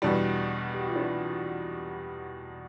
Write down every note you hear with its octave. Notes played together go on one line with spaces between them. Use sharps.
E2 B2 G3 D4 E4
G4
F#4
F4
D4 E4